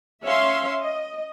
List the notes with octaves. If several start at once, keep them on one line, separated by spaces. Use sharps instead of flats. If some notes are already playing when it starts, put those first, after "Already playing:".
C#4 C#5 E5 F5 C6
D#5